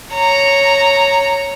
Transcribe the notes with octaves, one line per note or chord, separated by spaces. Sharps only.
C#5 A#5